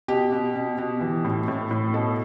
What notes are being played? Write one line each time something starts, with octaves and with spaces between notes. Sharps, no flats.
B2 G4
B2
B2
B2
E3
A2
A2
A2
B2 A4